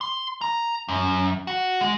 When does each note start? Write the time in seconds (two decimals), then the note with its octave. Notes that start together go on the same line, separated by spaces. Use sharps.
0.01 C6
0.41 A#5
0.89 F#2
1.47 F#4
1.81 G#3